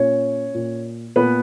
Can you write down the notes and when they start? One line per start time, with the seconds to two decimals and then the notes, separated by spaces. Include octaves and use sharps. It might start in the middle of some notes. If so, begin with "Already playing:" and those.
Already playing: A#2 C#4 C#5
0.54 A#2
1.16 A#2 B3 B4